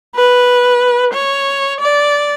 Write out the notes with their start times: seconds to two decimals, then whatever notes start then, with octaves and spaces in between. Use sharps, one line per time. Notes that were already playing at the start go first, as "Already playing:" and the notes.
0.15 B4
1.14 C#5
1.80 D5